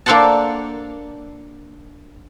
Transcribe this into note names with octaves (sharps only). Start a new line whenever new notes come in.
A#3 D4 A4 C5 F#5 A5